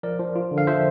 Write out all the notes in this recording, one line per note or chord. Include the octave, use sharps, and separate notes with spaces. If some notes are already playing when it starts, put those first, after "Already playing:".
F3 A#4 D5
F3
F4
D3
F5
F3 C5 E5